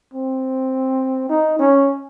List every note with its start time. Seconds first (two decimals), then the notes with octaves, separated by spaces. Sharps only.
0.14 C4
1.30 D#4
1.59 C#4